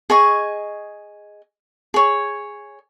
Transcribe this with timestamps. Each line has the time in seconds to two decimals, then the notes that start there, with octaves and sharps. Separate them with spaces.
0.10 G#4 D#5 C#6
1.94 G#4 C#5